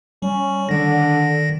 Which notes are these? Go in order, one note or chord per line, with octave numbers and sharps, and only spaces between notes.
G3 C#4
D3 D#3 A#6